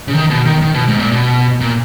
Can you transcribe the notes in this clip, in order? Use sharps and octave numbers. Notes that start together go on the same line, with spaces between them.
C#3
D#3
B2
D#3
D#3
B2
G#2
A#2
B2
A#2